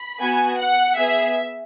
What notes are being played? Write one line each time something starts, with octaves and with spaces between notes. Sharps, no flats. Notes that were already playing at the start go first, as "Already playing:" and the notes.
Already playing: B5
B3 F#4 G#5
F#5
B3 G#4 E5